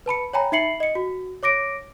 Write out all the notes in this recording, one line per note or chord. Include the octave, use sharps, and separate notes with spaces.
B4 A5 B5 C#7
C#5 G5 G#5 A#5 B5
D#4 E5 B5 C7 C#7 F#7
D#5 C#7
F#4
C#5 D6 A#6 D7